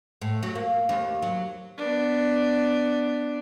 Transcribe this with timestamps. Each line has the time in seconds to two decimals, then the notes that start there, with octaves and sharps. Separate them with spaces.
0.22 A2
0.43 F#3
0.55 A#3
0.89 D#2
1.22 F#3
1.77 B3 D4